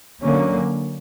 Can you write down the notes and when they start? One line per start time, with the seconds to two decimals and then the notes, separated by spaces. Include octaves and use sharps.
0.22 D3 F#3 A#3 C#4